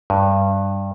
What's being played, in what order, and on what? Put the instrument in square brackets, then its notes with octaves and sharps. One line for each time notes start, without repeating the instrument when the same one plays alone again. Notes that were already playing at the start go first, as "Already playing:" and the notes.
[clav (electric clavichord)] G2